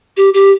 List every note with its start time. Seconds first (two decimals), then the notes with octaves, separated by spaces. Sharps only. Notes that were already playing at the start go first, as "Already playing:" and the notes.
0.17 G4
0.34 G4